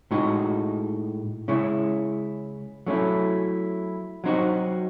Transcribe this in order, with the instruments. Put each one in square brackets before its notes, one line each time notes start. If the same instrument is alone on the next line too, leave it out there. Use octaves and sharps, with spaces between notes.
[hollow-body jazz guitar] A2 G#3 D#4 F#4
C#3 G#3 C#4 E4
F#3 A3 C#4 E4
F#3 C4 D#4 F#4